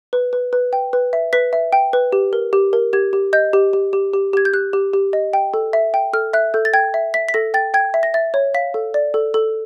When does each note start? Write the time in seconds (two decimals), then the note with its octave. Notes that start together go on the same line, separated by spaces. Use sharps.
0.13 B4
0.33 B4
0.53 B4
0.73 G5
0.93 B4
1.13 E5
1.33 B4 B6
1.53 E5
1.73 G5
1.93 B4
2.13 G4
2.33 A#4
2.53 G4
2.73 A#4
2.93 G4 G#6
3.13 G4
3.33 D#5 G6
3.53 G4
3.73 G4
3.93 G4
4.14 G4
4.33 G4 G#6
4.45 G6
4.53 G4 F#6
4.73 G4
4.94 G4
5.13 D#5
5.33 G5
5.54 A4
5.73 E5
5.94 G5
6.13 A4 F6
6.33 E5 F#6
6.54 A4 G6
6.65 A6
6.74 G5 G#6
6.94 E5
7.14 E5 B6
7.29 B6
7.34 A4 A#6
7.54 G5 A6
7.74 G5 G#6
7.94 E5
8.03 A#6
8.14 E5 A6
8.34 C#5
8.54 F5 B6
8.74 A4
8.94 D5
9.14 A4
9.34 A4